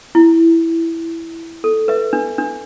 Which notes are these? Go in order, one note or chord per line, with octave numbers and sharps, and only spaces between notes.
E4
A4
B4 E5
D4
D4